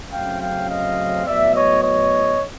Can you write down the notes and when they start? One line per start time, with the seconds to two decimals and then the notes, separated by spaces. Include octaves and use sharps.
0.11 F#2 C#3 F#3 A3 C4 F5 G5
0.40 F5 G5
0.69 D#5 F5
1.26 A2 F#3 B3 D5 E5
1.54 C#5 D#5
1.83 C#5 D#5